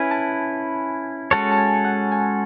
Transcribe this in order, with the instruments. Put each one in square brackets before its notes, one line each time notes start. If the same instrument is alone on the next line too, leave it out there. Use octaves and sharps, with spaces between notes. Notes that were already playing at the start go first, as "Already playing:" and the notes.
Already playing: [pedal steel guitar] C#4 E4 B4 [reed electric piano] G#5
[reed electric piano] A5
[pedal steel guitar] G#3 C#4 F#4 A4 C#5 [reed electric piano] A5
[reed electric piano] A5
G#5
F#5
G#5